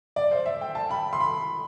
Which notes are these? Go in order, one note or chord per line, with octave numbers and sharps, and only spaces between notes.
D5
C5
E5
G5
A5
B5
C6
B5